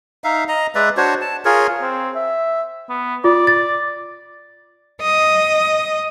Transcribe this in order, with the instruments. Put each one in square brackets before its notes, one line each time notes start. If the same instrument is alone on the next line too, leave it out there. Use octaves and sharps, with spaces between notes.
[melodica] D#4 E5 F5
D#5 A#5
G#3 B4 D5 E5
D4 F#4 C5 C#5
A5
F4 G#4 A#4 C#5
[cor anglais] C4
E5
B3
[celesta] F4 [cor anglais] D5
[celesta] A6
[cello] D#5